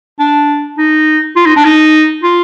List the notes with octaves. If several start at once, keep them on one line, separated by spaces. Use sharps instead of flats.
D4
D#4
F4
D#4
D4
D#4
F4